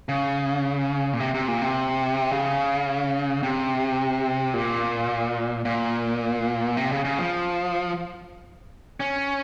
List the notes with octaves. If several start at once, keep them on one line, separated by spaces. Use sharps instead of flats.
C#3
A#2
C3
C3
A#2
C3
C#3
C3
A#2
A#2
C3
C#3
C#3
F3
C#4